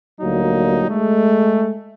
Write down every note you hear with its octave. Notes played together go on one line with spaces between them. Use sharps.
D2 A#2 F#3 G3 A#3 D#4
G#3 A3